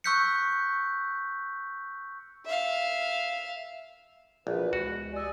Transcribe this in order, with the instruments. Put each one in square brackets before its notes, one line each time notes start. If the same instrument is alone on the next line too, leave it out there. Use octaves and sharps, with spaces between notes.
[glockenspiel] C#6 E6 F#6 G6 B6 C#7
[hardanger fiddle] E5 F5
[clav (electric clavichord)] A#1 [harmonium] B2 E3 B4
[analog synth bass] C#2 [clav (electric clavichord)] F#4
[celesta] G4 E6 [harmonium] D5 D#5 G#5